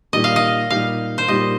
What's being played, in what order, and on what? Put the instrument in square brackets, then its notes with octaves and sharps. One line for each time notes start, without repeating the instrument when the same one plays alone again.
[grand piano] A#2 G3 D#4 G4 [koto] D#5
[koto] F5
D#5
[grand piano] A#2 G3 D#4 G4 [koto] F5
[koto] C5
[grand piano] A#2 G3 D#4 G4 [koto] D#5